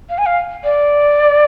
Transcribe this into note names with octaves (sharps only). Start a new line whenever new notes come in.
F5
G#5
F5
D5